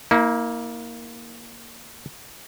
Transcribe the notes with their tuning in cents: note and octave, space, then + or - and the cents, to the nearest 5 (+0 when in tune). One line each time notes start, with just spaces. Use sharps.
A#3 +0 E4 -40